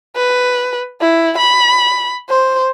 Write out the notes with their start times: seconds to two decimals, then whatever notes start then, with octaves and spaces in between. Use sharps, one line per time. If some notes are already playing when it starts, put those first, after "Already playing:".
0.16 B4
1.01 E4
1.38 B5
2.30 C5